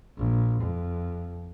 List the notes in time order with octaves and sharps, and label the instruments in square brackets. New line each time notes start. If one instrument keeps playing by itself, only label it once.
[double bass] A#1
F2